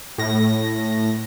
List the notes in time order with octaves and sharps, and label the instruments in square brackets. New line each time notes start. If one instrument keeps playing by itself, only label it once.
[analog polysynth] A2 A#6